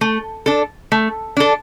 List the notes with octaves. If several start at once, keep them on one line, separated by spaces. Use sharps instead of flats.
A3
D4 A4
A3
D4 A4